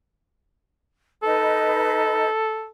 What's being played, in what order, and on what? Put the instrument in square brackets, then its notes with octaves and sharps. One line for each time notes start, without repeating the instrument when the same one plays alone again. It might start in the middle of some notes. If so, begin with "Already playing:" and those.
[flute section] D#4 B4 D#5 [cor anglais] A4